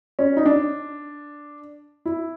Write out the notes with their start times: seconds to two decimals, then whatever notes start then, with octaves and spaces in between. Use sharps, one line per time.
0.19 C#4
0.37 D#4
0.46 D4
2.06 E4